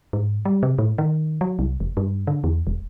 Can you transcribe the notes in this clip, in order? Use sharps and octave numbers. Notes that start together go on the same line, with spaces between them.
G#2
G3
C3
A2
D#3
F#3
C2
F1
G2
D3
E2
E1